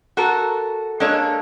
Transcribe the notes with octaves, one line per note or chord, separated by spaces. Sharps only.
F#4 A4 A#4
G#3 A#3 D4 A4 C#5